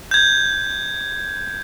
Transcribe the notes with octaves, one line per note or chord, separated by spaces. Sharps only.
G6 G#6